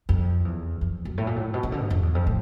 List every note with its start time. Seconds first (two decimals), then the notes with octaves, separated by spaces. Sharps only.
0.09 F2
0.45 E2
0.81 F2
1.05 F#2
1.18 A2
1.27 A#2
1.36 A2
1.54 B2
1.63 C#3
1.72 D3
1.81 G#2
1.90 F2
2.03 E2
2.15 F2
2.27 A2